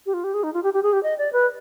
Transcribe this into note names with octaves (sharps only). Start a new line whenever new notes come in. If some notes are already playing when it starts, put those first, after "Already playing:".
G4
F4
G4
G#4
D#4
F4
G4
G4
G#4
G4
D#5
D5
B4